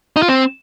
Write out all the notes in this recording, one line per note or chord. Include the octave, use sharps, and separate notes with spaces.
D#4
F4
C4